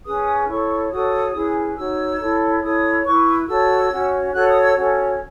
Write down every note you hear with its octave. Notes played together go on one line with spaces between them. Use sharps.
C#4 G#4 B4 D#6
E4 A4 C#5 C#6
F#4 A4 C#5 D#6
C#4 E4 G#4 B4
D#4 F#4 C#5 E6
E4 A4 C#5
E4 A4 C#5 D#6
E4 B4 C#6
F#4 A4 C#5 E6
C#4 F#4 C#5
F#4 A4 C#5 F#6
D#6
E6
C#4 F#4 A4 C#5